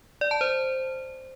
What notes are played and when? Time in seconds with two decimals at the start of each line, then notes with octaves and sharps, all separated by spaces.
0.21 D5
0.31 A5
0.41 C5